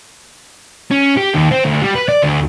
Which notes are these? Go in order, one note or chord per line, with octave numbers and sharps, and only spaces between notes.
C#4
G4
D#2
C4
D2
G3
B4
D5
D2